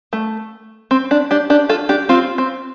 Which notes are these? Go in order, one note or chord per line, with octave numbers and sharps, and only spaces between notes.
A3
C4
D4
D4 G4
D4 G4
F4 A4
D4 G4
C4 F4
C4